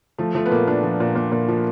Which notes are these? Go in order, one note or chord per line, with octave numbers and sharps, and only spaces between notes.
F3 A3
F3 A3
B3
A#2 A#3
A#2 D4
F3
A#2
A#2
A#2
F3